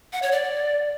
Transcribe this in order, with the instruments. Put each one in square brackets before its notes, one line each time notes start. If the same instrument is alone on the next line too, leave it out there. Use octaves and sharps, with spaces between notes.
[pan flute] F#5
C#5
D5